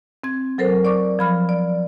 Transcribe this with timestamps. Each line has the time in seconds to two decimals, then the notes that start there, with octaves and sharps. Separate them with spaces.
0.24 C4 G#6
0.58 F#3 A4 A#4 C5
0.85 D5 C#6 D6
1.19 F3 B5 F6
1.49 D5